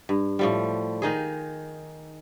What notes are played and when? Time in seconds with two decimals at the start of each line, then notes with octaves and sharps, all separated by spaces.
0.09 G2
0.39 A2 F3 G3
1.02 D#3 D#4 G#4